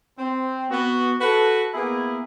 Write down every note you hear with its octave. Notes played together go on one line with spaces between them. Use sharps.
C4
B3 F#4
F#4 A4 B4
A#3 B3 E4 G#4